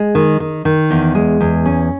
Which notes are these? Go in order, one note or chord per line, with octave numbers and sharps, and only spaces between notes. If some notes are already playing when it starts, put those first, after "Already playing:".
Already playing: G#3
D#3
D#3
D#3
E2
G#3
E2
C#4